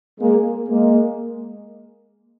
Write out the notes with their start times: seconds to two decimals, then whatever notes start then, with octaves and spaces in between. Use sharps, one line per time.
0.20 G#3 A#3
0.69 G#3 A#3